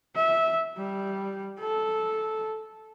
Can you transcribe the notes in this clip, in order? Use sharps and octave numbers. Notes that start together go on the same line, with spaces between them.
E5
G3
A4